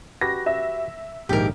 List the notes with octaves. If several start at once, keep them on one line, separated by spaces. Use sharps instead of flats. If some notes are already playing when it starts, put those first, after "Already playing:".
F#4 G4 B4 A#6
E5
A#1 G#2 D#3 G4 A#4